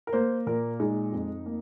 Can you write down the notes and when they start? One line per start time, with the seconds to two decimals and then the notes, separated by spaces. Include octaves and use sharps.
0.07 A#4
0.13 A#3 C5
0.47 A#2 A#4
0.80 G#3 D#4
1.12 F2
1.46 A#3